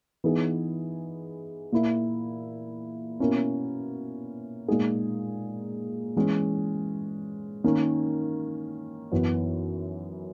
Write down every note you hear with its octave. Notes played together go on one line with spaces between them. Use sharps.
E3 B3 D#4 G#4
A#2 A#3 E4
B2 A#3 C#4 E4
A#2 G#3 D#4 G#4
E3 G#3 C#4
D#3 A#3 C#4
F#2 E3 B3